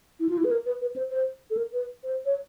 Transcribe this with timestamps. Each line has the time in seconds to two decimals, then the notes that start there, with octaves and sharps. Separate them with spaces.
0.20 E4
0.29 F4
0.38 E4
0.44 B4
0.51 A#4
0.66 B4
0.82 B4
0.96 C5
1.11 C5
1.50 A4
1.57 A#4
1.73 B4
2.04 C5
2.26 C#5